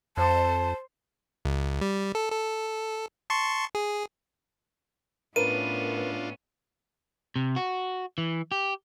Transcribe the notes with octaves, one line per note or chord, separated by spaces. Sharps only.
F2 C5 A5
C#2
G3
A4
A4
A5 C6 C#6
G#4
A2 B3 C#4 D4 F4 A#4 B4 D#7
C3
F#4
E3
G4